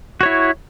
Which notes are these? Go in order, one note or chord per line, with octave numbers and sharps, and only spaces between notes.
E4 F#4 C#5